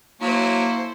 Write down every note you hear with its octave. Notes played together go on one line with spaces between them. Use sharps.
F#3 A#3 E4 A4 C5